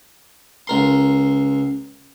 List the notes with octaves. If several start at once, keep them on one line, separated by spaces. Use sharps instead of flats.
C#2 A#4 C6